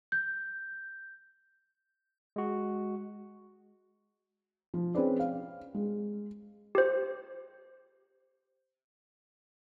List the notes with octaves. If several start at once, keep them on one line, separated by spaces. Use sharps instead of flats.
G6
G#3 F#4
F3
C4 C#4 G#4 B4 C5 D5
F5
G#3
G4 C5